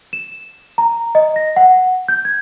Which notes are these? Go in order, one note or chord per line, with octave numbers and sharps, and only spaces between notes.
E7
A#5
D#5
A#6
F#5
G6
G#6